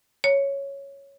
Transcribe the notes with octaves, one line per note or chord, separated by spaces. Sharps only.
C#5